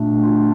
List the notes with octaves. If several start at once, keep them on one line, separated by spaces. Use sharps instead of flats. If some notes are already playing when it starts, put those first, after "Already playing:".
Already playing: A#2 A3 D4
F4